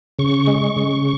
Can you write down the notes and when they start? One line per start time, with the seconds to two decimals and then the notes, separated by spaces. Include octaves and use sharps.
0.19 C#3 C#6
0.47 G#3
0.76 C#3